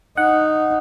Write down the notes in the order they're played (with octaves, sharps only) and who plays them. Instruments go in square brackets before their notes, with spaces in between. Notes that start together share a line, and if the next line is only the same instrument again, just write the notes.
[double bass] D#4 [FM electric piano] F#5